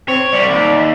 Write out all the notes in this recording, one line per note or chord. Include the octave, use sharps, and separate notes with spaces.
C4 C#5
C2 G3 D5
D#2